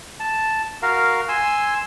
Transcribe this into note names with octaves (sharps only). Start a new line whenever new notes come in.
A5
F#4 A#4 F5
G#5 C6 E6